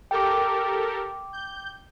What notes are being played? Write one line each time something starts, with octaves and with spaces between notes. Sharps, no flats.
G4 A4 A#4 G5 D6
G6